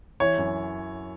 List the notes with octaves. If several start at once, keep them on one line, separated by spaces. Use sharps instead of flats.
E3 C#5
F#2